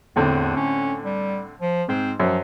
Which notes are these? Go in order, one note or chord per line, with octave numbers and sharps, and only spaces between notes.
E2 A2 D3 C4
C#4
G3
F3
G#2 C4
F#2 F3